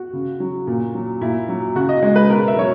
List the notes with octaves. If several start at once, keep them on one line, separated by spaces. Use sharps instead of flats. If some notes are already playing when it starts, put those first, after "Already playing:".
Already playing: F#4
C#3
F#3
A#2
F#3
A#2 E4
F#3
C#3 F#4
D#5
G#3
B4
B2 A#4
E5
F#3 C#5